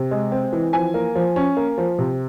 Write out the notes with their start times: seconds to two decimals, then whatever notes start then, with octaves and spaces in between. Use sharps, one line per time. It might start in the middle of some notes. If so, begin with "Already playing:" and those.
Already playing: C3
0.11 G#3
0.32 C4
0.52 E3
0.73 F3 G#5
0.94 A#3
1.15 F3
1.36 C#4
1.57 A#3
1.78 F3
1.99 C3